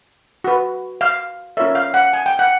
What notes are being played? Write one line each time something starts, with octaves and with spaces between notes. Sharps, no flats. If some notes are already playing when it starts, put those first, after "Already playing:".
F#4 B4
F5
C#4 F4 A#4 C#5 E5
F5
F#5
G#5
G5
F#5